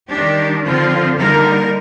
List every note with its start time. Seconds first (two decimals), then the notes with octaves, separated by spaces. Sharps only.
0.10 D#3 G3 D4 G4
0.64 D3 F3 C4 F4
1.19 D3 G3 A#3 D#4 A#4